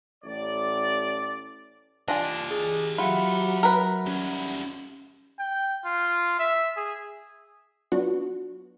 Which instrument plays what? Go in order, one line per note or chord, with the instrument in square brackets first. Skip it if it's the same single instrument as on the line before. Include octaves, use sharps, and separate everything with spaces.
[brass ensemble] A1 D5
[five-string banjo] D4 F4 G#5 [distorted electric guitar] G4 D#5
[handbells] G#4
[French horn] F#3 [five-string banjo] F4 [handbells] E5 F#5 B5
[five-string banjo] A#4 B4
[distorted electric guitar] G3 C#4
[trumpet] G5
F4
E5
G#4
[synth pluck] F#3 B3 D4 F4 F#4